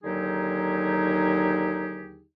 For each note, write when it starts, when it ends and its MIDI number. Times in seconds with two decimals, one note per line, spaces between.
0.03 2.25 39
0.03 2.25 50
0.03 2.25 54
0.03 2.25 63
0.03 2.25 67
0.03 2.25 68